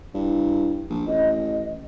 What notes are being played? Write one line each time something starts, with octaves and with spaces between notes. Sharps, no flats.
G2 E4
A#1
A1 D#5